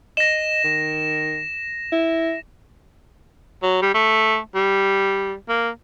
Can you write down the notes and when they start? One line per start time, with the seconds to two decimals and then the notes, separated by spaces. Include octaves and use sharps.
0.17 D#5 A#6 E7
0.64 D#3
1.92 E4
3.62 F#3
3.82 G3
3.94 A3
4.55 G3
5.49 A#3